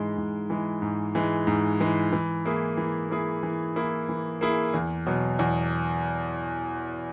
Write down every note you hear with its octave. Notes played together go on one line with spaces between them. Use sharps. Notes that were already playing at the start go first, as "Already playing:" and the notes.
Already playing: G#2 E3 G#3
G#2
E3 G#3
G#2
E3 G#3
G#2
E3 G#3
E3
A#3 E4 G#4
E3
A#3 E4 G#4
E3
A#3 E4 G#4
E3
A#3 E4 G#4
E2
B2 F#3
E2